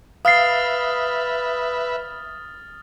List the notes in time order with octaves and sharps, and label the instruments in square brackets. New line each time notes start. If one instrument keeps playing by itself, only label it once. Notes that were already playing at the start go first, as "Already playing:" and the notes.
[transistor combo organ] B4 E5 [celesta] F5 C7 [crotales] D#6 F6 A6